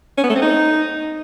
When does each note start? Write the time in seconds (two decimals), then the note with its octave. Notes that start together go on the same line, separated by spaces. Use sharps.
0.17 C#4
0.24 B3
0.30 A3
0.36 C4
0.42 D#4